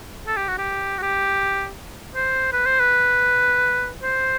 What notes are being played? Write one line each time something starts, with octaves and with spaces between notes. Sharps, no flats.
A4
G4
F#4
G4
F#4
G4
C5
B4
C5
B4
C5